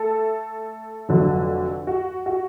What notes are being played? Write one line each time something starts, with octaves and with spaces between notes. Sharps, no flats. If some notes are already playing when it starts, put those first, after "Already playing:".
Already playing: A3 A4
F1 F2 D3 F#3
F#4
F#4